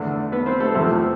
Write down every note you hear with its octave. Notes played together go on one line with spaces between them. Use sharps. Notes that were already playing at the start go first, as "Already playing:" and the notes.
Already playing: E2 D3 A3 D4
B3 B4
C4 C5
A3 A4
E2 C3 F3 A3 C4 A4